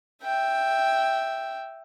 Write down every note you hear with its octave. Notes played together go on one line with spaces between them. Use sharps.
E5 G5